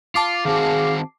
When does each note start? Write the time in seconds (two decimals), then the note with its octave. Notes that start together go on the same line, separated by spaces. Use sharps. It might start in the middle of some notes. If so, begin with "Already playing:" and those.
0.15 F4 A5 D6 C7
0.45 D#3 C4 F#4 G#4 F5